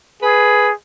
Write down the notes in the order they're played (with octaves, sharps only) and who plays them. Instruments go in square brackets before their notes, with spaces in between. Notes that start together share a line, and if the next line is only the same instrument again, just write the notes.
[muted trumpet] G#4 [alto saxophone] B4